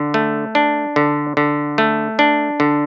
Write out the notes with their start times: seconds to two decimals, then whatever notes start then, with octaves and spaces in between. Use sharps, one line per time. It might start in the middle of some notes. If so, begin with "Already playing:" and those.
Already playing: D3
0.14 A3
0.55 D4
0.96 D3
1.37 D3
1.78 A3
2.19 D4
2.60 D3